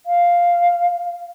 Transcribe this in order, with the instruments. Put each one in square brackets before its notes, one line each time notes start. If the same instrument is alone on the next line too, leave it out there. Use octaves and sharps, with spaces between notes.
[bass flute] F5